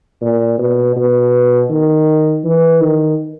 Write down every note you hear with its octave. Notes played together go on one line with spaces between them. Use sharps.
A#2
B2
B2
D#3
E3
D#3